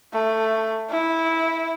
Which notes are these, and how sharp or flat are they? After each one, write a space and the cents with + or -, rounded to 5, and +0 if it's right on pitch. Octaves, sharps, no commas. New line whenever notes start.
A3 +10
E4 -10